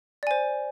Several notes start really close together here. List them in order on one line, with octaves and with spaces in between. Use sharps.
D5 G#5 C5